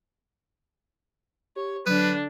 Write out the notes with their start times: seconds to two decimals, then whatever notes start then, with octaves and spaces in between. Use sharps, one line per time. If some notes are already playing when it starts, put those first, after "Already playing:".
1.56 G4 C#5
1.86 D3 F#3 D4 B4